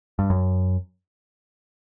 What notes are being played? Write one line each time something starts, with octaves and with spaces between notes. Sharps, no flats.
G2
F#2